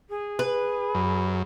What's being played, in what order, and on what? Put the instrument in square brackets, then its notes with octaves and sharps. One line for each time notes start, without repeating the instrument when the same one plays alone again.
[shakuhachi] G#4
[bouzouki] B4
[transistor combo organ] F#2